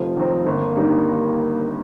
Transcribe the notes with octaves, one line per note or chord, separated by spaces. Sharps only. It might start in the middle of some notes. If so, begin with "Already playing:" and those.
Already playing: F1 F3
D#2 D#3 C4 D#4
G1 A#3
G2 D#3 G3 D#4